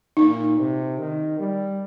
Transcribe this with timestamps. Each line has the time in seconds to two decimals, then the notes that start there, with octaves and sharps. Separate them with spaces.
0.17 A#2 D#4
0.58 C3
0.98 D#3
1.39 G3